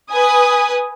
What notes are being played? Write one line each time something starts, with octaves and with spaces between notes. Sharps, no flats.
B4 G#5 D#6